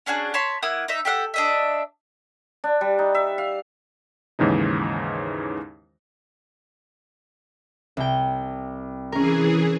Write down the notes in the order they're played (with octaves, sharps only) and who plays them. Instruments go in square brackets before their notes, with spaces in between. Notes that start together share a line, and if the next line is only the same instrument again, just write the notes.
[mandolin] C#4 D4 F#4 G#4
C#5 A5 B5 C6
A#3 E4 F#5 D#6
D#4 E5
G4 A4 F5 F#5
D4 D#5 E5
[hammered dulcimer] D4
G3
D#4
E5
F5
[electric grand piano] D#2 G#2 C#3 E3 D#4
[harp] C2 G5
[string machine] E3 G#4 [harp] C#4 A#4